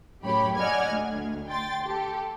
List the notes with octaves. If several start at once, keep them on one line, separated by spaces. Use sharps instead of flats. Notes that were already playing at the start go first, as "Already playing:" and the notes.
F#2 A2 G4 C#5 B5
D5 D#5 F#5 G#5 F6 G#6
D2
G5 C6 A6
G4 A4